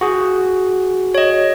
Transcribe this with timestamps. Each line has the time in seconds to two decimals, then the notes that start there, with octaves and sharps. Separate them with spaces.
0.01 F#4 G#4
1.15 C#5 D#5